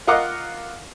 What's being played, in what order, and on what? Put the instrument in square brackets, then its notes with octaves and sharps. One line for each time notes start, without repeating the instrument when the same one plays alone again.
[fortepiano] F4 A#4 D#5 F#5 D6